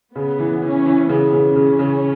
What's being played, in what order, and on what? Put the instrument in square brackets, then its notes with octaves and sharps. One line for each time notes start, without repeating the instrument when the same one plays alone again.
[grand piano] C#3 [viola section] B3
[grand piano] E3
[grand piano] E3 [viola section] C#4
[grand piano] E3
[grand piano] C#3 [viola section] B3
[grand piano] C#3
[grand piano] C#3 [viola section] C#4
[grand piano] C#3